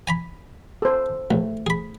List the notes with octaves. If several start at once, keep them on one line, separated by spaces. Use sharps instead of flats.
G#5 A#5 B5
A4 C5
A#1 A3
G#4 B5